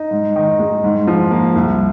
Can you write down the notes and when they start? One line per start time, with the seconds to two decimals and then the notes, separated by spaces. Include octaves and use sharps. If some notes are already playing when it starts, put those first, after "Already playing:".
Already playing: D#4
0.11 G#2
0.36 D#3
0.59 G#3
0.84 G#2
1.07 F3
1.31 A#3
1.55 C2